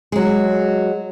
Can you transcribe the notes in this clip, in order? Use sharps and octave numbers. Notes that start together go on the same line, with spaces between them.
F#3 G#3